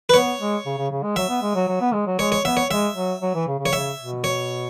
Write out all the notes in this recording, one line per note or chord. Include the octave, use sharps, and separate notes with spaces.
B4
B3 C#5
G#3
C#3
C#3
C#3
G#3
F#3 E5
B3
G#3
F#3
F#3
B3
G#3
F#3
G#3 C#5
C#5
B3 E5
C#5
G#3 E5
F#3
F#3
E3
C#3
C#3
C#5
C#3 E5
B2
C#5